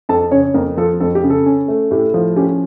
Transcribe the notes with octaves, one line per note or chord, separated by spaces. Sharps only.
F2 A4 A5
C#3 C#4 C#5
F2 A#3 A#4
F3 A4
F2 A4
G4
C#3
A4
C#4
A3
A2 G4
F3
C#4 G4